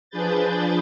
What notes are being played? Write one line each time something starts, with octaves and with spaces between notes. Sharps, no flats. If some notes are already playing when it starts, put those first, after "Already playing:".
F3 D4 G#4 B4 G6 A6